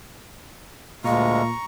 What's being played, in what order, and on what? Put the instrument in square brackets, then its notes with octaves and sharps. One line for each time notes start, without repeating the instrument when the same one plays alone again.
[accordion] D2 G#3 [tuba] A#2 [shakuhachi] F5 [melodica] A#5 C#6